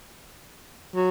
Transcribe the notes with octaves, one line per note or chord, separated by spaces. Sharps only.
F#3